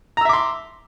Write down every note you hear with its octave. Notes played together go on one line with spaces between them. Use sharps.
E5 A#5 C6 D6 E6